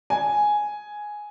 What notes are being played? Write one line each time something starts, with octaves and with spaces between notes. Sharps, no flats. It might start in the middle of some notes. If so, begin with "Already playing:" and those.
G#5